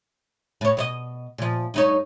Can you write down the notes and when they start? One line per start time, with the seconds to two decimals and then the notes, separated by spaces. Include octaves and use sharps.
0.61 A2 C#5
0.77 B2 C#5 D#5
1.38 A#2 F3
1.74 G2 D#4 C#5